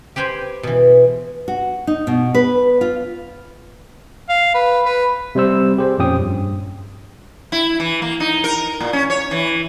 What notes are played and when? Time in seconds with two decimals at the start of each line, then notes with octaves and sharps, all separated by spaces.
0.16 G4 B4 C5 G5 G#5
0.63 B2 E3
1.48 F#4
1.87 D#4
2.07 B2
2.35 B4
2.81 F4
4.29 F5
4.55 B4
4.86 B4
5.35 C3 G3 C5 E6
5.78 G4 G#4 C5
5.98 F2 A#2 C#4 G5 D#6
6.19 G2
7.52 E4
7.80 E3
8.02 A#3
8.20 D#4
8.44 A#4
8.80 A#2
8.93 C#4
9.10 C#5
9.31 E3